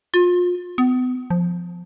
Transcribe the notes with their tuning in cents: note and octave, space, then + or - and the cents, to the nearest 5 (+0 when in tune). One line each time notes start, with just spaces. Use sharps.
F4 +30
B3 +35
F3 +5